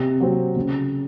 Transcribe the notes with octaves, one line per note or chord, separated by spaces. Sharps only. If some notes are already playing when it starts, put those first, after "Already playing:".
Already playing: C3
F#3 C4
C#3